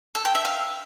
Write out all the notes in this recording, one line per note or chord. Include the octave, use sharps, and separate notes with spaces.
A4
G5
E5
F5